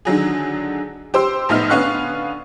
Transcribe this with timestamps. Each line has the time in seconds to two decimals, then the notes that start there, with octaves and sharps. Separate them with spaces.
0.05 D3 D#3 F#3 G#4
1.14 G4 C5 C6 E6
1.49 A#1 A2 B3 D#4 E5 F6
1.70 D3 B3 C#4 F5 C#6 F#6